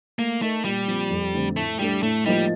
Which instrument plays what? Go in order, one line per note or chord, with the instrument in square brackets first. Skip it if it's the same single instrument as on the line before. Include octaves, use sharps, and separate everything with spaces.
[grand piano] A3 [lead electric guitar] A#3
[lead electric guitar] A3 [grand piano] D#4 A#4
[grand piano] A#2 [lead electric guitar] G3
[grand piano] F3 C4
F2
D3 A3 C4
[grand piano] A2 [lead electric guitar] A3
[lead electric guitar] G3 [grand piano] A3 D4 A4
[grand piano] A2 [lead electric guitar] A3
[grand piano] F3 A#3 D#4 [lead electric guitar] G3